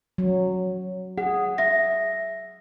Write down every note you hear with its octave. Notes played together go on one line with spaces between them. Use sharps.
F#3
G#4 F#5
E5 A#6